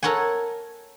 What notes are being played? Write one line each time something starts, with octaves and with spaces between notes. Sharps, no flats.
A4 A#4 C#5 F#5 G#5